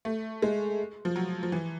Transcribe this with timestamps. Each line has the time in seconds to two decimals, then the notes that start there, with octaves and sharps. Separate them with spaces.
0.05 A3
0.42 G#3
1.05 F3
1.16 F#3
1.43 F3
1.52 E3